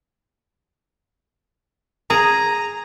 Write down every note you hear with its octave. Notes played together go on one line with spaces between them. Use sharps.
G#4 A#5